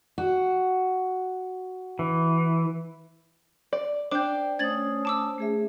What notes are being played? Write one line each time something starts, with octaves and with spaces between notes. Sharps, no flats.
F#4
E3
D5
D4 C5 D5 G5 D6 G6
A3 C#4 C5 D#6 G#6 A6 F#7
A5 D6 E6
A3 G#4 E5